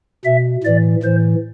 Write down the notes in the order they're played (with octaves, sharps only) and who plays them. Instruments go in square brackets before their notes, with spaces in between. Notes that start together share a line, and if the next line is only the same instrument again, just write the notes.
[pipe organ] B2 E5
A2 E3 D5
A2 E3 C5